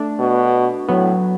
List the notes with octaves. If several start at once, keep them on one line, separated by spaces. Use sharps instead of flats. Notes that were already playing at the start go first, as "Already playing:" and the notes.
Already playing: A3 D4
B2
A2 F#3 B3